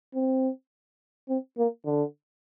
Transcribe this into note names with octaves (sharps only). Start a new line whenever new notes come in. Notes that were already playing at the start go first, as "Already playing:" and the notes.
C4
C4
A#3
D3